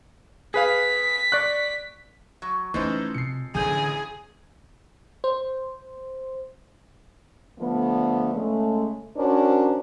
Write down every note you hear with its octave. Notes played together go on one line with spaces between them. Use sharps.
G#4 B4 F5 B6
D5 C#6 F#6
F#3
E3 F3 G#3 A3 C#4 D#4 A4 C5
C3 C7 C#7
A1 D3 G#4 G6 D#7
C5
D3 F3 A3 B3
C#3 G#3 A3
C#4 D4 F#4 A#4 C5